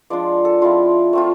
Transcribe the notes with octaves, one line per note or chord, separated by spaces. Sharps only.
F3 G#3 D4 F4 D5
A4
F3 G#3 C4 E4 F4
A3 C4 F4